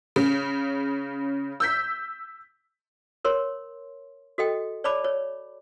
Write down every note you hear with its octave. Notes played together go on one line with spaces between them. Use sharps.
C#3
E6 G6 B6
A#4 C#5 C6
F#4 A4 D#5 G5
C#5 D5 A5 B5 D6
C#5